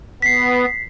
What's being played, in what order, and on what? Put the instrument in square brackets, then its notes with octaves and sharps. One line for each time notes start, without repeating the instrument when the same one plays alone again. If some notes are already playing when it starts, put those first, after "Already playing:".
[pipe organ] B3 [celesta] B6 C7